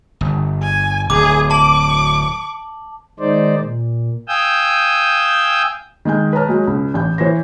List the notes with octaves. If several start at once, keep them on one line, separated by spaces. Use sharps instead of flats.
G1
G#5
D1 G#4 D6
A5 D6 F#7
D#3 G#3 D#4 C5 D5
A#2
F5 G5 G#5 D#6 E6 G6
D#3 G#3 G#5 G6
B4 C#5 A5 A#5 F6
F#3 G#3
C#2
A1 G6
E3 C5 C#5 A#6